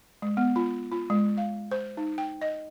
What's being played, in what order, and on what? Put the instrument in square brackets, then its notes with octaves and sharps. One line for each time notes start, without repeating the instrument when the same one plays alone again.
[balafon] G#3
B3
F4
F4
G#3
F5
C5
D#4
G5
D#5